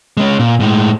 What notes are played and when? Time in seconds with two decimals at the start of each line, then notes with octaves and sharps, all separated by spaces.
0.17 G#3 C#4
0.39 A#2
0.60 A2 G#3